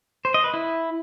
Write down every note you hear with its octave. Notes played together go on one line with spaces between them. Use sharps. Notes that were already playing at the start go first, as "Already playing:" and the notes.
C5
D#5
B4
E4